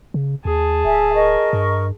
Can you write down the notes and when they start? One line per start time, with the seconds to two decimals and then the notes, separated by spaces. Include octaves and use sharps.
0.14 C#3
0.45 D#2 G#4 A5
0.85 D1 E5 G#5
1.15 A#4 D#5 C#6
1.53 G2